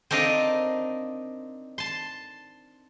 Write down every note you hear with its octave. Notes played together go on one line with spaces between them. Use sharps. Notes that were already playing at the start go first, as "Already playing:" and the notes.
C4 D4 D#4 A#4 D#5 F5
A5 C6